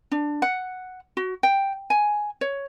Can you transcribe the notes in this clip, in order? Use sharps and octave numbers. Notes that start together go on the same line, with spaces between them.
D4
F#5
F#4
G5
G#5
C#5